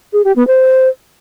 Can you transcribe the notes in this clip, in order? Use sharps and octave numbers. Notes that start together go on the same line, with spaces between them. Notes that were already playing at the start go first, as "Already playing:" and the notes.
G#4
G4
B3
C5